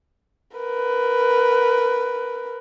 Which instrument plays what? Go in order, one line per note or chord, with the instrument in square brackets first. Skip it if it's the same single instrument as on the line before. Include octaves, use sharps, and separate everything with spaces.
[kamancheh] A#4 B4